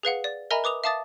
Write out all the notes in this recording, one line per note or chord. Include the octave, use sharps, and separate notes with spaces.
G#4 B4 F5 F#5
D5
A#4 D#5 E5 G#5 A#5 B5
B4 D6 D#6 F7
E5 F5 A5 D6 D#6 A6